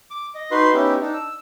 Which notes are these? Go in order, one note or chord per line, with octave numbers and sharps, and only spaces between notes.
D6
D#5
D#4 F#4 B4 C6
B3 C#4 D#4 E4 G4
D4 D#4
E6